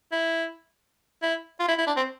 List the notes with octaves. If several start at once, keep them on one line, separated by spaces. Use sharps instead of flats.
E4
E4
F4
E4
E4
D4
C4